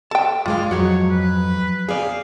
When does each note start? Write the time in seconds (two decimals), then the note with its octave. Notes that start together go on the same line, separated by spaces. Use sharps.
0.11 A4 G5 A5
0.46 G2 G#3 F4 D5 F5
0.71 F2 G#2 F#3 F#4 C#5
1.10 B4
1.89 C4 G#4 D5 F5